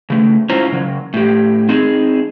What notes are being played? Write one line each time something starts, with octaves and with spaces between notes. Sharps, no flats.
C#3 A3
G#2 C#4 E4 F4 C5 A#5
C#3 F#3
A2 G4
C4 D#4 G#4